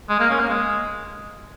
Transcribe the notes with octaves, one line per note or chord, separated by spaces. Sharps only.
G#3
A#3
C#4
A#3
G#3